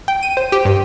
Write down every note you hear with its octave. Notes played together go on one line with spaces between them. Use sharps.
G5
D#7
C5
G4
G2